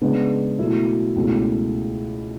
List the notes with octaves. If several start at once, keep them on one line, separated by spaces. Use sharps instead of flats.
C#3 G#3 B3 D4
B2 F#3 A3 E4
C#2 B2 A3 C#4 E4